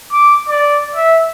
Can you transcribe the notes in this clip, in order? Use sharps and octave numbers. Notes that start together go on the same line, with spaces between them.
D6
D5
E5